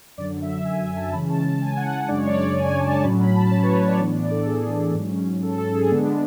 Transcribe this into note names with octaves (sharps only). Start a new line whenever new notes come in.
F#2 D3 F#3 D5
E5
G#5
G#5
A5
C#3 E3 G#3 C#4 B5
A5
A5
G#5
F#5
F#2 C#3 G#3 D4 D5
C#5
D5
G#5
A5
A2 F#3 C#4 B5
B5
A5
C#5
B4
C#5
D5
A2 E3 B3 D4 D5
D5
A4
G#4
G#2 F#3 C#4
A4
A4
G#4
D3 G#3 B3 D4 A4